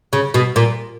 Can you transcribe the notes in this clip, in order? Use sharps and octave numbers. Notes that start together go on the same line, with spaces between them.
C#3
B2
A#2